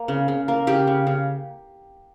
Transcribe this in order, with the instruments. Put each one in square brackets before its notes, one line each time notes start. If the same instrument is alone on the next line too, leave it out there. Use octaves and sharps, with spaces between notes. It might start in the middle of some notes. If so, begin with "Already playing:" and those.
Already playing: [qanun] A#3
C#3
C#3
A#3
C#3 G4
C#3
C#3